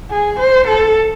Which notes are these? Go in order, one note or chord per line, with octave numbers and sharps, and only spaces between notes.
G#4
C5
A4